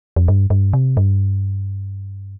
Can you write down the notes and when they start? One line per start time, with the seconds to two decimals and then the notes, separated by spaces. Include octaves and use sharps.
0.16 F2
0.28 G2
0.50 G2
0.73 C3
0.97 G2